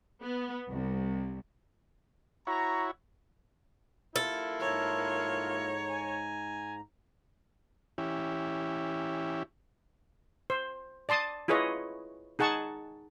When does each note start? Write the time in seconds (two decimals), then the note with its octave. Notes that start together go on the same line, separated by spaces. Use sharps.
0.23 B3
0.71 C2
2.47 E4 F#4 C#5 A#5
4.16 A#3 E4 F4 A4
4.60 G#2 C#5 A#5
5.90 G#5
7.98 E3 C#4 E4 G4
10.50 C5
11.09 D5 A5 C6 D#6
11.48 E4 F4 G#4 B4 C#5 D#5
12.39 D#4 G#4 F#5 A5 C#6